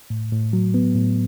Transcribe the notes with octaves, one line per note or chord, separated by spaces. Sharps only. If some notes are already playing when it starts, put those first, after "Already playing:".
A2
A2
F#3
B3
A2